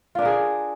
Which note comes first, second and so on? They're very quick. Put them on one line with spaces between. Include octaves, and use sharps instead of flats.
F4 D4 A#4 G#4